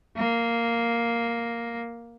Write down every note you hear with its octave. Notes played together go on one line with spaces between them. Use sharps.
A#3